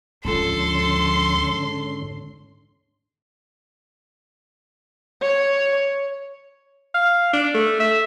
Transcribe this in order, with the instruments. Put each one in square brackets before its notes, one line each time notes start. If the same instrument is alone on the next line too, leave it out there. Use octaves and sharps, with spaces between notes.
[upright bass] D2 F3 [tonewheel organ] G#2 D3 C#4 [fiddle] A4 [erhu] C6
[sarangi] C#5
[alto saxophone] F5
D4
A3
E5